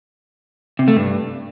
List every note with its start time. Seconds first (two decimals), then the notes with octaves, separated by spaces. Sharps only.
0.79 C3
0.88 A3
0.96 G2